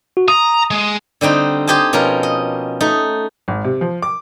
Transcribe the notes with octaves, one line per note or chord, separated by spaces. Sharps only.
F#4
A#5 D#6
G#3
D3 G3 C4 D#4
G4 C5 D#5 G#5 A5
B2 F3 C#4 A#4
D#5
A3 D#4
G#1
C3
F3
D6